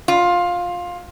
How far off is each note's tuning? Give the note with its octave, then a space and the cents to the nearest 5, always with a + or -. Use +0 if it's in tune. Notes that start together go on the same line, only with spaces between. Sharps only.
F4 +15